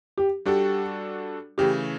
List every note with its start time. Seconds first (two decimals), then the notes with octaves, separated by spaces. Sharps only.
0.18 G4
0.45 G3 D4 F#4 G4 A4
1.58 C#3 E3 A3 G4